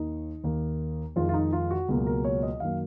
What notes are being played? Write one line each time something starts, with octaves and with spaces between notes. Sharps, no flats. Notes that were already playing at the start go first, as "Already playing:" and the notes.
Already playing: D#2 D#3 A#3 D#4
D#2 D#3 A#3
F2 D#3 G#3 F4
F4
D#4
F4
F#4
C#2 B2 F#3 A#3
A#4
C#5
D#5
F#2 D#3 F#3 A#3 F5